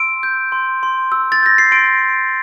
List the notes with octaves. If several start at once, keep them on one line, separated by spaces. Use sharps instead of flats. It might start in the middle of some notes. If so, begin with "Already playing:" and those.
Already playing: C6 E6 D7
G6
C6
C6
E6
A6
G6 A#6
C7
C6 D7